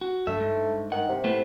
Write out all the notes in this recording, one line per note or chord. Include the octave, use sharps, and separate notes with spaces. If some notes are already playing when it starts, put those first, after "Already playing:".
F#4
G2 A3 E5
G#2
D#3 F#5
C3
A2 A3 B3